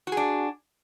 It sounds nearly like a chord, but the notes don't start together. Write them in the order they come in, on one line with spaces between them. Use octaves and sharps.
F#4 G#4 D4